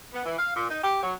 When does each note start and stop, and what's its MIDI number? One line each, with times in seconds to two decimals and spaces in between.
0.13 0.23 59
0.25 0.37 52
0.39 0.53 77
0.56 0.69 46
0.70 0.78 63
0.82 1.00 67
1.03 1.14 54